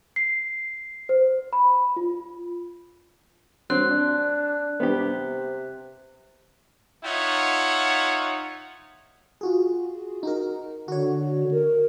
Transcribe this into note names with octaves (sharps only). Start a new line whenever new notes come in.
C7
C5
B5
F4
F#3 C4 F#6
D4
C3 B3 G4
D#4 F4 C#5 E5 F#5
F4 F#4 G#4
D#4 F#4 A#4
D3 F#4 C#5
A#4